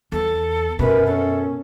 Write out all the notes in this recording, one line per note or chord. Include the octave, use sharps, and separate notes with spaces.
E2 A4
F#2 B2 A#4 B4
C#4 A4